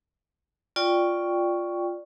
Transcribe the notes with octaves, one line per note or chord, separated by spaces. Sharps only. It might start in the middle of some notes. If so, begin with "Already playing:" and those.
F4 D5 G5 C#6